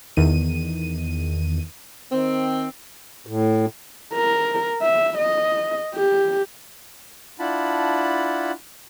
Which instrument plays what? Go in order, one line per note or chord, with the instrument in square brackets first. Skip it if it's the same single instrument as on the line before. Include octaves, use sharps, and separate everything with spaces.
[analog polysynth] E2 D#3 D#7
[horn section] D#3 C4
[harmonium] A2
[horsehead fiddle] A#4
E5
D#5
G4
[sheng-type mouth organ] D4 E4 F4 F#5 A5 B5